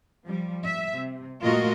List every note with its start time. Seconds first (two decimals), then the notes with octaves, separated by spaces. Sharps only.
0.25 F3 G3
0.65 E5
0.95 C3
1.43 A#2 A3 F4 F#4 A#4 D#5